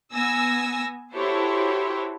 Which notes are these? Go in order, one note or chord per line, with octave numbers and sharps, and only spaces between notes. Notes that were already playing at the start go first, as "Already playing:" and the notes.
B3 G#5 E6 A#6
E4 F#4 G4 A4 C5 C#5